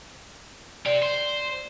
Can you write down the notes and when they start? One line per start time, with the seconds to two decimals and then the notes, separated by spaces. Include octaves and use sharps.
0.86 G4 C5 D5
1.03 C5